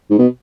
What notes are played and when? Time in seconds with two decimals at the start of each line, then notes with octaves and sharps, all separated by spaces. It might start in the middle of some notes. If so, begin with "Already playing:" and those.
0.10 G#2
0.19 B2